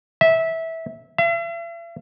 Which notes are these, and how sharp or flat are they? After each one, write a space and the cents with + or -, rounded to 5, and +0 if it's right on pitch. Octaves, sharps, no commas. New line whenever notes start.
E5 -15
E5 +45